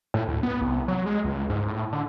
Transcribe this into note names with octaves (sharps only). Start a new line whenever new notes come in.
A2
D2
B3
C2
F#3
G#3
C#2
G#2
A2
D3